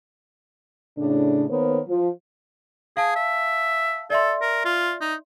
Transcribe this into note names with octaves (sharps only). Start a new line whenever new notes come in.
A2 C#3 D4
D#3 A#3 B3 A#4 C5 C#5
F3
G#4 F5 A5
E5
A4 D5 E5 C6
A#4
F4
D#4